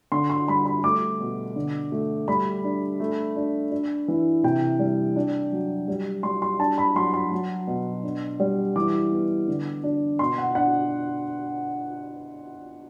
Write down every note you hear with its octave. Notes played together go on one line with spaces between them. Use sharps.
D3 C6
C6
G3 B5
B5
A3 D6
B2
D3
A3
G3 B5
D4
A3
D4
D4
E3
C3 G5
G3
D4
F#3
G3
G3 C6
C6
D4 A5
B5
F#3 C6
C6
F#3
B2
D4
G3
E3 D6
B3
D3
D4
B2 C6
F#5
D4 F#5